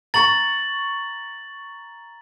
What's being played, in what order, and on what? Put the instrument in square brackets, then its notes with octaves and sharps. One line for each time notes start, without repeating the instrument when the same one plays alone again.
[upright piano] A#5 C#6 [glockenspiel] A6 F#7